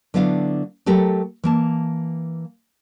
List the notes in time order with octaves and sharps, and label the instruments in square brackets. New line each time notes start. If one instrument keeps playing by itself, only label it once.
[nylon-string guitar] D3 F#3 B3 D4 E4 F5
F#3 A3 G4 A4 A#4
E3 A#3 A5